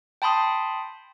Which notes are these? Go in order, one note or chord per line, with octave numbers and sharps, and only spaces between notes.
G5 A5 B5 C6 D#6